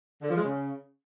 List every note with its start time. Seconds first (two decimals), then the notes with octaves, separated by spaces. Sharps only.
0.22 D3
0.29 F3
0.36 G#3
0.44 C#3